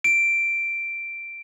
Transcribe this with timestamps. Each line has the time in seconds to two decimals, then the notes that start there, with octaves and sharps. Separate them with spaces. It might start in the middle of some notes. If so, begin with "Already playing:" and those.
0.04 D7